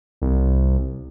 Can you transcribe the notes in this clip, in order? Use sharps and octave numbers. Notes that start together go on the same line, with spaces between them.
C2